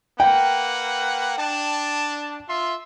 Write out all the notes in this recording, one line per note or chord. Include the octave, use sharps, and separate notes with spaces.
A#3 B4 F#5 G5
D4 A5
F4 E5 C6